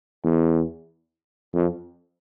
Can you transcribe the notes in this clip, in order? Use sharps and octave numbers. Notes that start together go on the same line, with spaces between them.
E2
F2